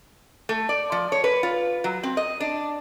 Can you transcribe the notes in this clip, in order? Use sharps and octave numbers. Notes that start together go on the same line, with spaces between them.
A3
D5
F3
C#5
B4
F4
F#3
C4
D#5
D4